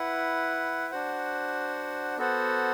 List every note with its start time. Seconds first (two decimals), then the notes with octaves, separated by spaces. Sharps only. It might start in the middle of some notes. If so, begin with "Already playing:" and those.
Already playing: E4 B4 F#5
0.91 D4 F#4 C5 F#5
2.18 B3 F#4 A4 C5 F#5